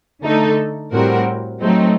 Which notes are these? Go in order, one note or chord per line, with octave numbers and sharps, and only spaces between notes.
D3 A3 D#4 A4
A2 G3 C4 F#4 A#4
F#3 A3 C4 D#4